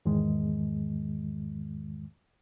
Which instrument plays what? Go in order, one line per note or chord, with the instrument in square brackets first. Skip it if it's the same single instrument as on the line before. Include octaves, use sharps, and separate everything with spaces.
[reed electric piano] E2 G#2 D#3 G#3